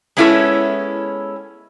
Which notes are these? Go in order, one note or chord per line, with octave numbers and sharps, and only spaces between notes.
G#3 B3 C#4 E4 A4 C#5